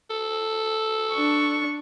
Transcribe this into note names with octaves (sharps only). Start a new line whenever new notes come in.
A4
D4 C#6